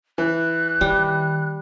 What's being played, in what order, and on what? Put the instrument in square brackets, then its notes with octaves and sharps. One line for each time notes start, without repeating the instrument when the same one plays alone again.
[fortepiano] E3 [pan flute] F#6
[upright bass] D#3 [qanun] G3